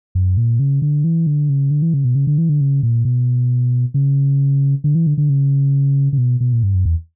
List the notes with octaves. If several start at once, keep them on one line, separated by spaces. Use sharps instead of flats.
F#2
A#2
C#3
D3
E3
D3
C#3
D3
E3
C#3
B2
C#3
D3
E3
D3
C#3
A#2
B2
C#3
D3
E3
D3
D3
C#3
C#3
B2
B2
A#2
G2
F#2
E2